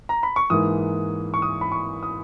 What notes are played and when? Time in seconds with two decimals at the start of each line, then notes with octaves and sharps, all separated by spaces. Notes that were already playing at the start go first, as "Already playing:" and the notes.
0.09 A#5
0.23 B5
0.36 C#6
0.50 G#2 E3 A#3 D#6
1.34 C#6
1.42 D#6
1.61 B5
1.72 C#6
2.03 D#6